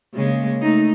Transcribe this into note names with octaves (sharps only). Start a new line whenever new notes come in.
C#3 G#3 A#3
A3 D#4